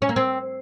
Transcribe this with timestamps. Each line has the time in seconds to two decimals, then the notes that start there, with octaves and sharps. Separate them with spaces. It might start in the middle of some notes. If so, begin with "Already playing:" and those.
0.02 C#4
0.09 A#3
0.16 C4